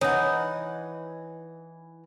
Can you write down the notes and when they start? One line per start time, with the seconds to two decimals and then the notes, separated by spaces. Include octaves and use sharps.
0.01 E3 D#4 C#5 F#5